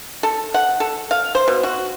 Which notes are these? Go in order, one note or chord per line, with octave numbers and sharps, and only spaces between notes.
A4
F#5
A4
F5
C5
B2
F#4